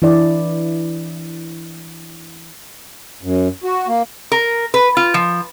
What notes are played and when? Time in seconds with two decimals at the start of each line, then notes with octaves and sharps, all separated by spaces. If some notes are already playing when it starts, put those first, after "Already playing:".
0.02 E3 D4 E4 D5
3.23 F#2
3.64 F#4
3.87 A#3
4.32 A#4
4.74 B4
4.97 F4
5.14 F3